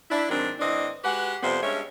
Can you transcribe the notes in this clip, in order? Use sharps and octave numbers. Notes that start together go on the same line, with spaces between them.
D4 E4
G#2 D#3 F#3 C4 D4
A2 E3 C4 D4 D#5
G#3 F#4 G4 B4 F#5
F2 C3 G3 B3 C5
G2 G#3 C#4 C#5 E5